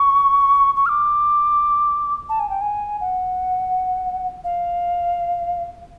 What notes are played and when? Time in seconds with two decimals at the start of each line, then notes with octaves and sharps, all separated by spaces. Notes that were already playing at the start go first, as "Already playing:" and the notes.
Already playing: C#6
0.76 C#6
0.86 F6
0.89 D6
2.29 A5
2.40 G#5
2.50 G5
2.61 G#5
3.01 F#5
4.44 F5